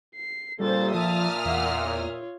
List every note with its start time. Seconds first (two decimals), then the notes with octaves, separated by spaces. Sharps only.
0.16 C7
0.60 A#2 C#3 G3 A4 C5 A6
0.95 F3 E5 A5 D#6 F6
1.46 E2 F5 F#5
1.83 F4 C#5